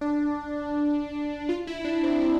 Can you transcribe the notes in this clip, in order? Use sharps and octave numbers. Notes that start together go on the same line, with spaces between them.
D4
F4
E4
D4
C4
C4